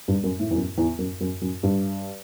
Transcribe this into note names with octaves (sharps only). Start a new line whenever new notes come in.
G2
F#2
A2
E2
F#2
E2
F#2
F#2
F#2
G2